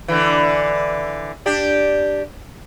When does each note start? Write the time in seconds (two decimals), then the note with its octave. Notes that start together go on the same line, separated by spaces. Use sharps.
0.08 D3 E3
1.46 D4 G4